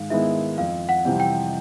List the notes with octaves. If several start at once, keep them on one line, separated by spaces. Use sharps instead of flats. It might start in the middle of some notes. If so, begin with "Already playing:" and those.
Already playing: G#2 D#3 G#3 F5
D#3 G#3 B3 E4 E5
F2 F5
F#5
C3 E3 G3 C4
G5